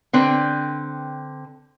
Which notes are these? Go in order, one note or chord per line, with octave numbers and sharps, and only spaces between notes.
D3 C4 B4